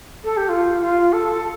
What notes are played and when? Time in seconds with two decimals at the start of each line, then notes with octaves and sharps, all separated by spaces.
0.24 A4
0.37 G4
0.49 F4
0.81 F4
1.13 A4